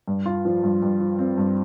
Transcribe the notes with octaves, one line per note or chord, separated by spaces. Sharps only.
G2
F4
F3
G2
G2
F3
C4
G2